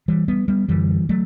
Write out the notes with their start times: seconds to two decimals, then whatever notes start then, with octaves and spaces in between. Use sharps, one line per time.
0.08 E3 G3
0.28 G3 B3
0.48 G3 B3
0.69 F#2 D3 E3 G3
1.09 F#3 A3